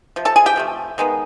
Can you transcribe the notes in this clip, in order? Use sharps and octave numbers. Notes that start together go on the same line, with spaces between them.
C3 F3
A4 A5
G#4 G#5
G4 G5
C3 F3 A3
D#3 G#3 B3